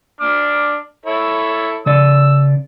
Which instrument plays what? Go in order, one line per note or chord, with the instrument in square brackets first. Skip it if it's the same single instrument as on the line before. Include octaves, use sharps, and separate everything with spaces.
[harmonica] D4 D6 F6
E4 A4 C#5
[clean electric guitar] C#3 D5 [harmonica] E6